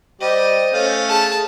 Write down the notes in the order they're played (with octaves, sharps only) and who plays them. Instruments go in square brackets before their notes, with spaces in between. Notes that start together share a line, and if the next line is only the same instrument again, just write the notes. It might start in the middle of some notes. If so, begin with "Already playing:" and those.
[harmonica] G3 G4 [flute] C5 [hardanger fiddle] D#5
[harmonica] A3 C#4 F5
[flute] G#4 [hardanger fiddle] A5